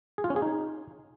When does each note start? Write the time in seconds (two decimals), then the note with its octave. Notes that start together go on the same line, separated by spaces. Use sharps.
0.18 G#4
0.24 F4
0.30 C#4
0.36 G#4
0.42 D#4